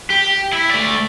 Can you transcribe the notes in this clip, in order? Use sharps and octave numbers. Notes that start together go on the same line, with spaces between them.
G4
E4
A3 D5